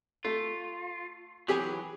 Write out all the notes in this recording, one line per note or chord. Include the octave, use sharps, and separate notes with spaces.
A3 F4
E3 F#3 G4 G#4 G#5